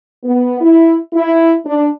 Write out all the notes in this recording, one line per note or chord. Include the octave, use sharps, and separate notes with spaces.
B3
E4
E4
D4